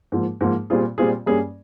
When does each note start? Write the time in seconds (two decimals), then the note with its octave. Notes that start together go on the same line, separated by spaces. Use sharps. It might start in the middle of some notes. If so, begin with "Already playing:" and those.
0.12 G#2 F3 A#3
0.41 G#2 F3 A#3
0.70 A#2 G3 C4 F4 G#4
0.98 A#2 G3 C4 F4 G#4
1.26 G2 G3 A#3 C#4 G#4